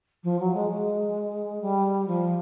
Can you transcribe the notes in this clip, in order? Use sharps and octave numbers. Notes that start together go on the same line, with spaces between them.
F3
F#3
G#3
G#3
G3
F3